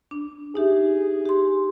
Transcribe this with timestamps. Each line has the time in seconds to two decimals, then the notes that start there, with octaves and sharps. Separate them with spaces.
0.11 D4
0.55 D#4 G4 G#4 E5
1.25 G4 C6